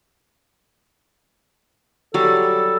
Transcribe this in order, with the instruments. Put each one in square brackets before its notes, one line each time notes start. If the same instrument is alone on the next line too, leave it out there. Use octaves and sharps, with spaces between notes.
[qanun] F#3 G3 [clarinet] A4